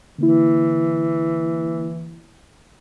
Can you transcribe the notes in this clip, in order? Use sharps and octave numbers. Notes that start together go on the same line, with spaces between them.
D3 E3 A#3 E4